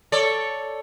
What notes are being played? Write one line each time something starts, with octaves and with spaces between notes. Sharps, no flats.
A4 C#5 D5